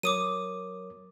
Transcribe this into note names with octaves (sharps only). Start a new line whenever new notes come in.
F#3 A#4 C#5 D6 D#6 D#7